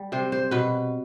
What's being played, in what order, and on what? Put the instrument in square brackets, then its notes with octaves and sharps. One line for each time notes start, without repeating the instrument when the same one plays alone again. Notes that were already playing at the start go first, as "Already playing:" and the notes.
Already playing: [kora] G3
C3 C5
C5
B2 B4